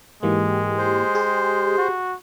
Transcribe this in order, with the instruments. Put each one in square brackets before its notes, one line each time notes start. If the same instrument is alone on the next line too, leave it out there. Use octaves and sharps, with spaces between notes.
[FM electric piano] G#2 E3 A#3 [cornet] G#3 [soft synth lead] G4
[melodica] C5
[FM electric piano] G#4
[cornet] F#4